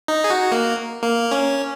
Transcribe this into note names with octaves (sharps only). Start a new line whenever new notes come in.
D#4
G#4
F#4
A#3
A#3
C#4